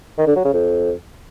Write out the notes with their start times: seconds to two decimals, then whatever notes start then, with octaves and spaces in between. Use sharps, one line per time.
0.18 D#3
0.27 D3
0.36 F#3
0.45 C#3
0.54 F2